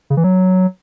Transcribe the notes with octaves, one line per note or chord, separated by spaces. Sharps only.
C#3
E3
F#3